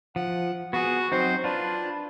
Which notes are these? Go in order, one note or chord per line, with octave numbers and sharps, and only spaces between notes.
F3 F#5
B3 F#4 G#4
F#3 C4 D#4 C5
D4 F4 B4